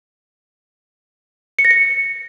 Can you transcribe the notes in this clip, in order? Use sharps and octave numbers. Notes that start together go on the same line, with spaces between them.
C#7
A#6
C#7